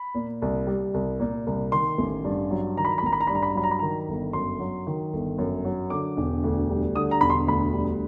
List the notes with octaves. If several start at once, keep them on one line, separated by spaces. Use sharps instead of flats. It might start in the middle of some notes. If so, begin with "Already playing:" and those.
Already playing: B5
A#2
C2
G3
C2
A#2
C2
D#3 C6
A1
G2
F#3
D#3 A#5
B5
A#5
B5
A1 A#5
B5
A#5
G2 B5
A#5
B5
A#5
F#3 B5
A#5
B5
D#3 A#5
G1
F#2 C6
F#3
D#3
G1
F#2
F#3
D3 D6
E1
D2
G3
D3 D#6
A#5
E1 B5
C6
D2 B5
G3